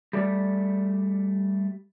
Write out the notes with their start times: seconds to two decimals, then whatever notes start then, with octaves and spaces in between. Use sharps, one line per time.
0.13 G3 A3 D5